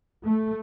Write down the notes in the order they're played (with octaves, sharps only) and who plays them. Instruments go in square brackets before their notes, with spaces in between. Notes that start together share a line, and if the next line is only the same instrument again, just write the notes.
[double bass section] A3